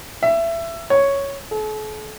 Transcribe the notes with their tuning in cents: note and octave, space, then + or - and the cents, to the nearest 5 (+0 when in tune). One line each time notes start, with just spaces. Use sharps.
E5 +20
C#5 +0
A4 -45